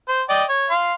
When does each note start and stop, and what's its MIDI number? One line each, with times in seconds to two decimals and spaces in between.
0.09 0.22 72
0.29 0.44 74
0.29 0.44 75
0.29 0.44 79
0.49 0.69 73
0.70 0.94 77
0.70 0.94 84